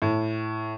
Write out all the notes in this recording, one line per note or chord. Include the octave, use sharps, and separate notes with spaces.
A2